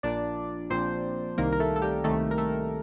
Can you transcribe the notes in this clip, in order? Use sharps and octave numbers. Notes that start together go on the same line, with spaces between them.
A#1 A#2 D4 D5
A#1 A#2 C4 C5
C2 C3 D#3 A#3 A#4
A#4
A3 A4
A4
G3 G4
C2 C3 D#3 A3 A4
A#4
A3 A4